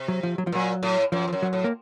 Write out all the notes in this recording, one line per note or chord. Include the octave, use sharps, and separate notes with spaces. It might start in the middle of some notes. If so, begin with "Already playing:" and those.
Already playing: C3
F#3
F3
F#3
F3
A#2 F#3
A2
F#2 F3
F2
F#2
F#3
A2
A#3